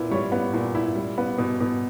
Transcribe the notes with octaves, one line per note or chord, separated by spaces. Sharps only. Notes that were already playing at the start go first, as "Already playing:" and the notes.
Already playing: A#2 B3 E4
G3 C#5
B3
A#2
E4
G3
B3
B2
B2